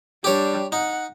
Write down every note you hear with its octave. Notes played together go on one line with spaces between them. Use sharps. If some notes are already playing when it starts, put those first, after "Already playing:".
G3 D4 G4 C#5
D#4 F#5